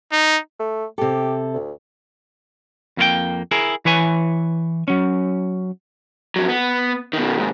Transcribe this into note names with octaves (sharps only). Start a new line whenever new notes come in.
D#4
A3
C3 G4 A4
D2
F2 A#3 F4 G5
E4 G#4 A#4
E3 B4 C#5 G#5
F#3 C#4
F2 F#3
B3
B2 D#3
D#2 G#2